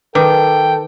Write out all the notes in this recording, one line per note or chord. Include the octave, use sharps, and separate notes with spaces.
D#3 A4 B4 G5 D6